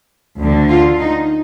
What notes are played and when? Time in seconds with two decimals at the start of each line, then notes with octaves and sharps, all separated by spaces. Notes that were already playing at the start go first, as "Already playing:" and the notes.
0.38 D2 D3
0.69 F4
1.00 D#4